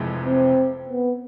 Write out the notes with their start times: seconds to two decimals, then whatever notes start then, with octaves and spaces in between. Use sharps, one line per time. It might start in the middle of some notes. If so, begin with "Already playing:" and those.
Already playing: F1 F2 C3 E3 G#3
0.26 C4
0.89 B3